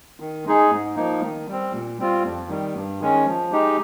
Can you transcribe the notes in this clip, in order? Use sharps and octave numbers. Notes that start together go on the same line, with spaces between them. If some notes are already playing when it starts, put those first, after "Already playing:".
D#3
G#3 D#4 G#4
G#2
F3 A#3 D#4
D#3
G3 C4
A#2
G3 C4 F4
F2
D#3 G3
G2
D#3 G#3 C#4
F3
G#3 D#4 G4